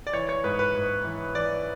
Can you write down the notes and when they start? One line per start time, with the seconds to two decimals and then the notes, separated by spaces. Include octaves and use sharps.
0.07 D5
0.13 E3 C#5
0.29 C#5
0.44 G#2 B4
0.59 B4
0.74 G#2
1.05 E3
1.35 E3 D5